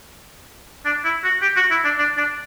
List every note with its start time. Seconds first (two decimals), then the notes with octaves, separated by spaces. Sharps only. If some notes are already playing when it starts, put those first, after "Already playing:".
0.85 D4
1.04 E4
1.24 F#4
1.42 G4
1.56 F#4
1.71 E4
1.84 D4
1.98 D4
2.18 D4